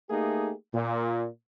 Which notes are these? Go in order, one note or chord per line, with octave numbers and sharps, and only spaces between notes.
A3 A#3 D#4 G4 G#4
A#2